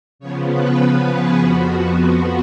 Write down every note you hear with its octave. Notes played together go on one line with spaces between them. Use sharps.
C#3 F3 B3 C#5
B4
B4
G#4
F2 F3 B3 F#4